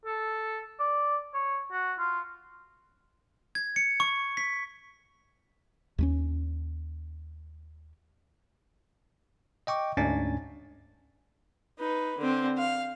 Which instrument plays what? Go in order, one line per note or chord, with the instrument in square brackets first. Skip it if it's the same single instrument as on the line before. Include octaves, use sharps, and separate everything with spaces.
[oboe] A4
D5
C#5
F#4
F4
[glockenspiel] G#6
C#7
C#6
B6
[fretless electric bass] D#2 A3 C#4
[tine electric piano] D#5 G5 C#6 D6
D2 G#2 C#4 D4 G#5 A6
[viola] D#4 B4
D3 C4
F5